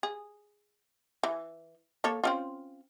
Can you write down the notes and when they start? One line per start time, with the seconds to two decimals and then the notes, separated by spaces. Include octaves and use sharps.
0.03 G#4
1.23 E3
2.04 A#3 A4 C#5
2.24 C4 C#4 F4